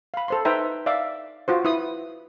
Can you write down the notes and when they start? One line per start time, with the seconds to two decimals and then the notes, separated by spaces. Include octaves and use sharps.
0.14 F5 B5
0.28 A4 C5 C6
0.45 D#4 B4 C5 E5 G5 A#5
0.86 D5 E5 F5 D6
1.48 F4 F#4 C5
1.65 E4 B4 D#6